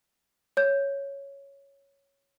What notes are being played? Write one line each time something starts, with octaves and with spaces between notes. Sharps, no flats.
C#5 G6